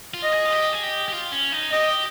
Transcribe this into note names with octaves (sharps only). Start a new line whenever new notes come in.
F4
D#5
G#4
F4
G4
G#4
G4
G4
F4
C#4
D#4
G4 D#5